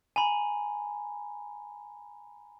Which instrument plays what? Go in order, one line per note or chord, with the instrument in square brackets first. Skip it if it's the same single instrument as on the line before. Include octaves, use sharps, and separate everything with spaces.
[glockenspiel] G#5 A#5 B5